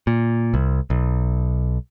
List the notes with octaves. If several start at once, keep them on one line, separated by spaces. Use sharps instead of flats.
A#2
C2
B1